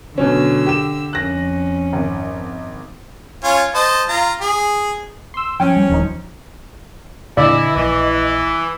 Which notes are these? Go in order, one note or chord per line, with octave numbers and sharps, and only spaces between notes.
B2 D3 F#3 C#4 E6
G4 E7
F2 C#4 F#6 A#6
G#1
C#4 F4 G#5
C5 D#5 A5
F4 A#5
G#4
C6 E6
F3 C#4 G5
G3
D#1 G2 D#3 D#4
A#2 D3 E3 D4 E4 D5 D#5
A#1 E3